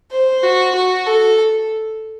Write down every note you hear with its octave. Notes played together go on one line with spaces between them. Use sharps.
C5
F#4
F#4
A4